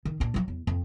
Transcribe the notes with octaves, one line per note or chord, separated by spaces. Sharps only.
D#3
A#2 D4
F3 F#3
E2
F2